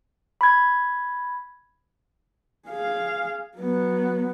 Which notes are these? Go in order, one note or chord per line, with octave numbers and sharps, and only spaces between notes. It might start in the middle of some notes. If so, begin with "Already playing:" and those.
B5 G#6
G#4 F5
F#3 B3